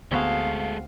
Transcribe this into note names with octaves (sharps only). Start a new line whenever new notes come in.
D2 G#3 B3 C4 F#4 G#4 A4 F5